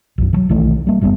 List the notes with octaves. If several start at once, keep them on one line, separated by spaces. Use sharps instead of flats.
B1 F#2
D#3 F#3
B1 D#3 E3 A3
G3 A#3
F#1 G3 A#3 B3